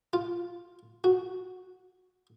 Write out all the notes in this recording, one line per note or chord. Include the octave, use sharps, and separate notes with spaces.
F4
F#4